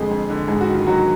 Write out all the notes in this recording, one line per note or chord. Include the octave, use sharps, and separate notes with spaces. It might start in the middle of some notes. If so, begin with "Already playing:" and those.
Already playing: F2 D3 G#3 G#4
F2
D3
G#2 G#4
F#4
D#3
F4
D#3 F#3 F#4